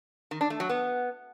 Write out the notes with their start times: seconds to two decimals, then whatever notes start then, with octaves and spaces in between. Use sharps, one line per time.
0.31 D#3
0.41 D4
0.50 A3
0.60 F#3
0.69 B3